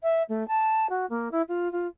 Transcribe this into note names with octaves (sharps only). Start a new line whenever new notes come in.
E5
A3
A5
F#4
A#3
E4
F4
F4